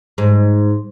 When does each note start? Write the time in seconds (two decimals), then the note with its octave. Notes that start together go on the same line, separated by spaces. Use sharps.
0.18 G#2